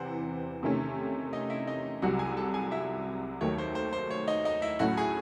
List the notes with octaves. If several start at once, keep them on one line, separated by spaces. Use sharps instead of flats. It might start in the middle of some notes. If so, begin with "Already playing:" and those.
Already playing: E2 C3 E3 C4 C5 F#5
C3 D#3 A3 C#4
D#4 D#5
E4 E5
D#4 D#5
C2 C3 F#3 F#4 F#5
G#4 G#5
A4 A5
G#4 G#5
E4 E5
D#2 D#3 F#3 A3 C#5
C5
C5
C5
C#5
D#4 D#5
D#4 D#5
E4 E5
A2 F#3 A3 C#4 E4 F#4 F#5
G#4 G#5